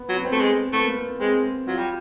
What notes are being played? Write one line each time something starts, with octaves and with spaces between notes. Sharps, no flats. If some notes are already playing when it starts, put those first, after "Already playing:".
Already playing: B3
F#3
B3
C4
A3
G#3
A3 B3
A#3
B3
G#3 C4
F#3 F4
G3